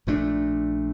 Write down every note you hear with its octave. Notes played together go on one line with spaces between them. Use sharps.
A#1 A#2 A3 D4